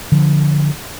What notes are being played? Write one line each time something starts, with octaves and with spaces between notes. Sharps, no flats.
D3 F3